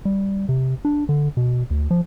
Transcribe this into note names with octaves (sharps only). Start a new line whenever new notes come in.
G3
C3
D4
D3
B2
D2
F3